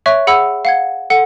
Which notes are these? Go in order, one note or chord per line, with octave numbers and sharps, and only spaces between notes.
C#5 E5 C#6 F#6
G#4 F#5 B5 E6
F5 F#5 G#6
A4 F#5